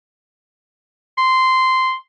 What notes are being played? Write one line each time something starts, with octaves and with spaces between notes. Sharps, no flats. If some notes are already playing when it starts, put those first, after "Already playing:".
C6